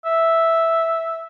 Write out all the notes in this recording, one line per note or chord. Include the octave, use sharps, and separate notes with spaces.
E5